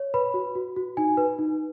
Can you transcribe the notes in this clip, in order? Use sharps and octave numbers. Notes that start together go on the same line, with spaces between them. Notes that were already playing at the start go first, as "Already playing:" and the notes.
Already playing: C#5
B4 B5
F#4
F#4
F#4
D#4 G#5
B4
D#4